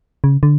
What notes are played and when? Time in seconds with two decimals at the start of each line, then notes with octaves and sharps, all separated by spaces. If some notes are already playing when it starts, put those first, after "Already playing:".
0.24 C#3
0.43 D3